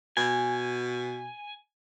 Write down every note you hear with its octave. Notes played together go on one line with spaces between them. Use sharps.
B2 G#5